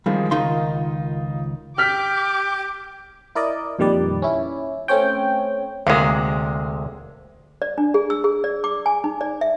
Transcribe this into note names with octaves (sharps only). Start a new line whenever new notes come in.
D#3 F3 G3 G#3
C#2 D#3 D#4 F4 C6
G4 G5 D6 F6 B6
E4 A#4 D5 D#5
F2 A#2 D#3 G3 B4 D5
C#4 E4
A3 C4 C#4 C#5 G5
D2 C3 G#3 A#3 G#4
D5
D4
G#4
E6
G#4
D5
D6
G#5
D#4
D5
E5